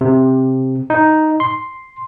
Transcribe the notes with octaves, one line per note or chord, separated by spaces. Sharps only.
C3
D#4
C6